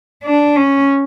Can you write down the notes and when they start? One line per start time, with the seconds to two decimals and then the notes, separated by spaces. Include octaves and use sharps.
0.24 D4
0.56 C#4